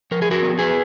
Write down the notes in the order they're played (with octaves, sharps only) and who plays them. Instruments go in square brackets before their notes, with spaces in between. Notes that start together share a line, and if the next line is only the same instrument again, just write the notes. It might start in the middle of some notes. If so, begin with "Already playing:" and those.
[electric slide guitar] F3 A#4
G#4
F#4 A#4
B3
G#4 B4